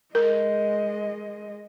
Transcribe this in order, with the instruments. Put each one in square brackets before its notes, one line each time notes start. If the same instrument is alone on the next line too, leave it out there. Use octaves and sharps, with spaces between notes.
[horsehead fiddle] G#3 D#5 [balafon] A#4